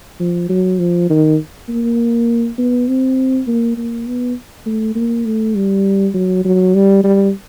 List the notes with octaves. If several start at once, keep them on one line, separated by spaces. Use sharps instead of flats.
F3
F#3
F3
D#3
A#3
B3
C4
A#3
A#3
B3
A3
A#3
A3
G3
F#3
F#3
G3
G3